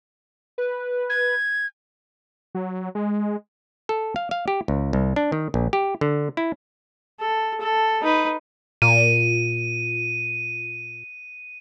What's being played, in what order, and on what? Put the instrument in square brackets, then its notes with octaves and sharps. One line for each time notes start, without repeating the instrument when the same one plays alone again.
[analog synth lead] B4
[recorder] G#6
[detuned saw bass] F#3
G#3
[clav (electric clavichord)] A4
F5
F5
G4
C#2
C2
D4
D#3
A#1
G4
D3
E4
[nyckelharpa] A4
A4
D#4 B4
[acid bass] A#2 [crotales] D#7